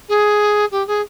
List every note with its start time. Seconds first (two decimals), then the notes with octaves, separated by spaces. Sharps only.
0.08 G#4
0.71 G4
0.87 G#4